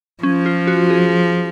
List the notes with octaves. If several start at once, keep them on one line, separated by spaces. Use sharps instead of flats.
F3 C#4
F4
F#4
G#4